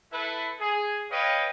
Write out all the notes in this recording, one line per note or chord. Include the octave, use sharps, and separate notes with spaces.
E4 A4 B4
G#4
B4 C#5 D#5 F5 G5